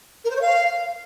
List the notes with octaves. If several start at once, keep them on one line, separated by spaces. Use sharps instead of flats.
A#4
C5
C#5
F5